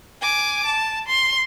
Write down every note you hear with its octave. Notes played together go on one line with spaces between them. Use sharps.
G#5 D6
A5
C6